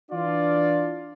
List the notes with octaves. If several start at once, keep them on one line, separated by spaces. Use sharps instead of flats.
E3 D4 F4 D5